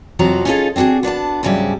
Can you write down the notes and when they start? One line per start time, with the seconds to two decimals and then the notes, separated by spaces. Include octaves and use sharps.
0.19 F2 C3 F3 F#3 F#4 A#5
0.45 C#4 D#4 F4 G#4 A4 F5
0.76 C4 D4 F4 F#4 G#4
1.03 B3 D4 D5 A5
1.43 D2 G#2 C#3 F#3 G3 E5